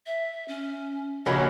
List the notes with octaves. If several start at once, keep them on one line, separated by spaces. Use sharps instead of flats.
E5
C#4
A#1 C#3 C#4 F#4 A#4 D#5 B5